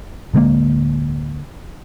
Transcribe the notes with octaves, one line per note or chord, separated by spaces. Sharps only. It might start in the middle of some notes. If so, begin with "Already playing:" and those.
D1 D3 G#3 A#3